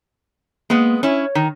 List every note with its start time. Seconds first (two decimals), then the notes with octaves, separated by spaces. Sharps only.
0.70 G#3 A#3 B3
1.03 C#4 E4 C#5
1.35 D#3